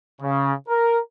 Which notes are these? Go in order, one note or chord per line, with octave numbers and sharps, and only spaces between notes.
C#3
A#4